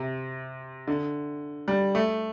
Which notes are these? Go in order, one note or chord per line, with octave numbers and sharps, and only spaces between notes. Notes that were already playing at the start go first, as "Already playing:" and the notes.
Already playing: C3
D3
G3
A3